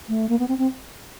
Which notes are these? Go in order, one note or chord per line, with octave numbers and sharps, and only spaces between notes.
A3
A#3
B3
C4
C4